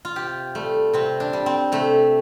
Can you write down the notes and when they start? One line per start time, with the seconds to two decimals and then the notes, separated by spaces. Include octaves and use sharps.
0.05 F4
0.16 C3 G4
0.55 G3 A3
0.93 C3 C4
1.20 D4
1.33 G3
1.46 C4
1.72 C3 A3